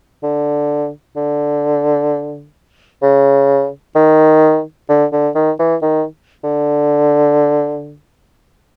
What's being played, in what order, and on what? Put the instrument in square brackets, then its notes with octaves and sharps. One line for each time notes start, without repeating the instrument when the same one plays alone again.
[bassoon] D3
D3
C#3
D#3
D3
D3
D#3
E3
D#3
D3